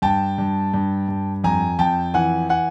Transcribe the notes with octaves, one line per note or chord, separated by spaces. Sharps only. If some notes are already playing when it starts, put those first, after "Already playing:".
G2 G5 A5
G2
G2
G2
F2 G#5 A#5
F2 G5 A5
E3 F#5 G#5
F#5 G#5